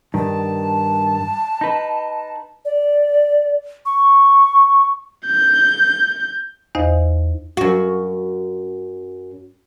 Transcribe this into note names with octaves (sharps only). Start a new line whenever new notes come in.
G2 D#3 A5
D#4 B4
D5
C#6
G6
E2 D#4 C5 D#5 F5
F#2 F#4